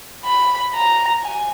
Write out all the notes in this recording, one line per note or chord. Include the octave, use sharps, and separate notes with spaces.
B5
A#5
G#5